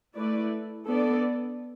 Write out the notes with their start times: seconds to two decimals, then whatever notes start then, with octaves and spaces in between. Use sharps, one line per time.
0.16 A3 E4 B4 D5
0.88 B3 D4 A4 D5